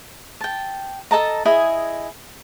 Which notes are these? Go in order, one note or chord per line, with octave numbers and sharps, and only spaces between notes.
G5 A5
A4 D#5 A5 A#5
E4 G#4 D#5 G#5